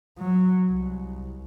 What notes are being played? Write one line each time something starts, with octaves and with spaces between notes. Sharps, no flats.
F#3
C2